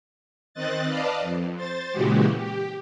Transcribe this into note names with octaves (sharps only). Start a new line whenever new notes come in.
D#3 C4 D#5 F#6 A6
B4 D5 D#5 F5 A5
F2
C5 A6
A#2 C#3 E3 G#3 F#4 G4
G4